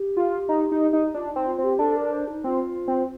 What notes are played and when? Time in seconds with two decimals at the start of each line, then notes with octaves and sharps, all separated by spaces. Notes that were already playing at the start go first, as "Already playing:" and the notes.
Already playing: G4
0.17 F4
0.49 D#4
0.72 D#4
0.93 D#4
1.14 D4 F4
1.30 D#4
1.36 C4
1.47 F4
1.58 C4
1.64 G4
1.79 D4 A4
1.96 A#4
2.12 C5
2.28 D#4
2.44 C4 F4
2.88 C4